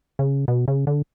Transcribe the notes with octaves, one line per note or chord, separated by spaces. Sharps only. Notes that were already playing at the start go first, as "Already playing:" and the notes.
C#3
B2
C#3
D3